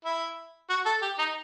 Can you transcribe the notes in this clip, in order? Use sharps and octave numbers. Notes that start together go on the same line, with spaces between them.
E4
F#4
A4
G4
D#4